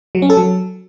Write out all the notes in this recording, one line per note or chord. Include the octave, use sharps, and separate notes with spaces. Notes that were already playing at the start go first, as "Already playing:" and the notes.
F#3
C#4
A4
F#3